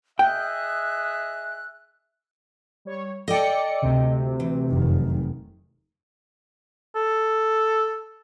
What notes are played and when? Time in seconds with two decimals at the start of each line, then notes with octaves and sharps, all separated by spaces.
0.19 G#4 D#5 E5 G5 F#6
2.85 G3 C#5
3.28 A4 D5 D#5 G5 C#7
3.82 D2 C3
4.40 E3
4.70 F1 F#2 D#3
6.96 A4